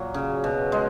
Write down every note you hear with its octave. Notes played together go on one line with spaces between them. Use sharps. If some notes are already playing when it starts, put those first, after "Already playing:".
Already playing: A#2 F#3 F#4 A#4
C#3
B2
G#3